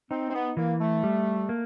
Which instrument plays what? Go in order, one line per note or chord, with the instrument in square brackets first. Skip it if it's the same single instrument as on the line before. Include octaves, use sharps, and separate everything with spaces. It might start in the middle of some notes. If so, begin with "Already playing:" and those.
[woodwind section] C4 [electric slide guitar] D#4
[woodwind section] C4
B3
[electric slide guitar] E3 [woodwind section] A#3
[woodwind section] A3
[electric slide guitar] G3
A#3